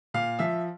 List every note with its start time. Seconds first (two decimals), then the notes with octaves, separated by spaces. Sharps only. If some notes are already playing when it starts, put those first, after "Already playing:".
0.14 A#2 F5
0.39 F3 E5